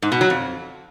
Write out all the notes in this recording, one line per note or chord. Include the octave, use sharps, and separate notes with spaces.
G#2
B2
F#3
F2